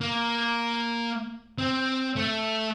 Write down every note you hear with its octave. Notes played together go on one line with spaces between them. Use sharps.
A#3
C4
A3